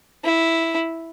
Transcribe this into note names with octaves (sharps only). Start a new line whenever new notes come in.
E4